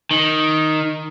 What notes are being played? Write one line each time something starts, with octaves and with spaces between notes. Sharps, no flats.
D#3